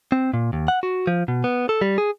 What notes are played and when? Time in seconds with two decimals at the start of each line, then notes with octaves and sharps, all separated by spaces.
0.12 C4
0.34 A#2
0.53 D#2
0.68 F#5
0.83 F#4
1.07 F3
1.28 B2
1.44 B3
1.69 A4
1.81 G3
1.98 G#4